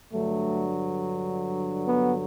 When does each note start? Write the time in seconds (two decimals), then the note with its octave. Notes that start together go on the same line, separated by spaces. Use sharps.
0.12 G2 D3 F#3 A3
1.86 B3